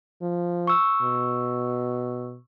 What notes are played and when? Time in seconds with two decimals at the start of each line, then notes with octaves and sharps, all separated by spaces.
0.22 F3
0.67 C#6 E6
1.02 B2